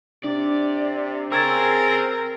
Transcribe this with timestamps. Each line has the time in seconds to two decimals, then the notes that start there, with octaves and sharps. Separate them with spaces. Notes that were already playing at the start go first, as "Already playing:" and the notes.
0.24 C3 D4 D5
1.32 C4 G#4 A#4 C#5 E6 G#6 A6